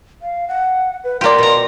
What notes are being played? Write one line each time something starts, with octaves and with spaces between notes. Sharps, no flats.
F5
F#5
B4
A#3 F4 G4 D5 C6
B2 A#5